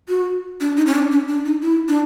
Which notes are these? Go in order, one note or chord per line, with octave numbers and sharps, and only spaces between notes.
F#4
D4
D#4
C#4
D4
C#4
D4
D#4
E4
D4